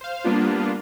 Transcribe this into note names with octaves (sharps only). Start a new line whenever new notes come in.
C5 F5
G3 A#3 B3 D4 F4